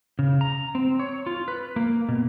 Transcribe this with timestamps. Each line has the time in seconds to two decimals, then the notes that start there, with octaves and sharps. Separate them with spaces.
0.19 C#3
0.41 A#5
0.75 C4
0.99 C#5
1.26 F4
1.48 B4
1.76 A#3
2.09 B2